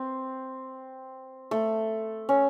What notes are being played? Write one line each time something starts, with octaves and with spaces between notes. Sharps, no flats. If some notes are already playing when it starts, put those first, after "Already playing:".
Already playing: C4
A3
C#4